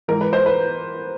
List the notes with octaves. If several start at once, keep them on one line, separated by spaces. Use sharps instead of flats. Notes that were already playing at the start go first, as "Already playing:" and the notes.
G#2 E3 A#4
B4
C5
B4